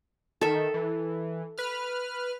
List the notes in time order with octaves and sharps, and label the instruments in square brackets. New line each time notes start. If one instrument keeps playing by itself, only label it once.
[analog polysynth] D#3 [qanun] A4 E5
[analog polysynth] E3
B4 F6